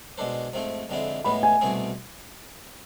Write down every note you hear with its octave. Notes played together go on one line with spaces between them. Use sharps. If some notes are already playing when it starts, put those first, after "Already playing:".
B2 G#3 D4 A4 C5
G#2 F3 A3 C4
F2 D3 G#3 C4 E4
A1 A2 E3 G#3 B3 B5
G#5
C2 B2 A3 C4 G#4